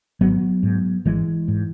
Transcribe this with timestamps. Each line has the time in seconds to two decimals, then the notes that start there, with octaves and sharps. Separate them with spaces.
0.21 G#1 F#3 B3
0.63 G#2
1.05 G#1 E3 G#3
1.48 G#2